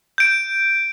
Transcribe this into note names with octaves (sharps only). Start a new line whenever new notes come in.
G6 D7